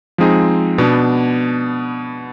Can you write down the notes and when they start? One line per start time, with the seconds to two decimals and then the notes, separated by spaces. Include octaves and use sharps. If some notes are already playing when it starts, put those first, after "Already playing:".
0.18 F3 G#3 C4 D#4 G#4
0.78 B2 B3 D4